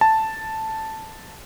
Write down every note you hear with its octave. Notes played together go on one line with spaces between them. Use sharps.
A5